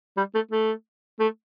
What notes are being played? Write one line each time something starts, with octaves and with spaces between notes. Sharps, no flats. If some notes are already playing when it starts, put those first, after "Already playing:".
G3
A3
A3
A3